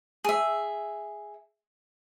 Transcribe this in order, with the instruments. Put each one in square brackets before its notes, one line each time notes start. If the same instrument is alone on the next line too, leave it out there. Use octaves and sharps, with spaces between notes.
[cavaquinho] G#4 E5